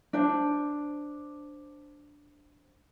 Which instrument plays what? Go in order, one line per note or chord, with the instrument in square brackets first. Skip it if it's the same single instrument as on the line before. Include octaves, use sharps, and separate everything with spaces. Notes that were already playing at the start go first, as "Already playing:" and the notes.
[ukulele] D4 C5 A5